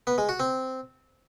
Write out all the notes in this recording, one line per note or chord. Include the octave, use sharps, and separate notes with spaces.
B3
G#3
F#4
C4